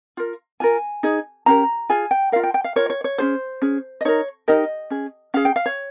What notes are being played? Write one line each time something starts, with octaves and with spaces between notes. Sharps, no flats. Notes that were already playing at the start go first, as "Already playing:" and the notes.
F4 A#4
F4 A#4 G#5
D#4 G#4
C#4 G4 A#4 A#5
F4 G#4 G#5
G5
F4 A#4 F5
G5
G5
F5
F4 A#4 C#5
C#5
C#5
C#4 F4 G#4 C5
C#4 G#4
D#5
D#4 A#4 C#5
D#4 G4 A#4 D#5
C#4 G#4
C#4 G#4 F5
G5
F5
C#5